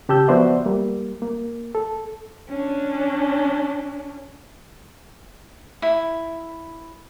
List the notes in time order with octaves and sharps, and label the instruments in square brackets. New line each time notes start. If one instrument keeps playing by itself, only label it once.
[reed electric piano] C#3 G4 A5 E6 G6
F3 B3 F#4 C5 D5 E5
G3 A#3
A#3
A4
[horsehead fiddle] C#4 D4
[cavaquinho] E4